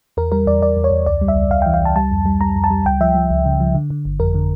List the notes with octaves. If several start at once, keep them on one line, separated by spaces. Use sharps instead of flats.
E2 A#4
G3 A#4
E2 D5
E2 D5
E2
C#5
E2
C#2 D5
G3
E5
C#2
C#2 F5
E3 G5
F5
C#2 A5
G3 A5
F2
G3
G3 A#5
F2
A5
G3
C#2 G5
F3 E5
F3
C#2
C#3
F3
D3
D3
G1
F2 A#4
D3